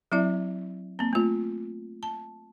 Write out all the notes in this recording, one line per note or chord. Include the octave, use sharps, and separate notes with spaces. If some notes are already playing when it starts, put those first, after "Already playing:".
F#3 C4 E4 D5 E5
A#3 C4
A3 F4
A5